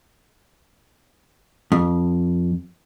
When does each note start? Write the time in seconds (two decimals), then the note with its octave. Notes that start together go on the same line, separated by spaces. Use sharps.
1.72 F2